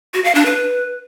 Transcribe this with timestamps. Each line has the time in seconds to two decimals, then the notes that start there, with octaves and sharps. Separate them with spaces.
0.14 F#4
0.24 F5
0.35 D4
0.45 B4